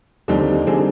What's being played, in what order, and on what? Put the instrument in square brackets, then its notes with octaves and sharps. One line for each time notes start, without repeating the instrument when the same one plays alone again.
[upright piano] D#2 D3 G3 C4 D#4
D3 G3 C4 D#4 G#4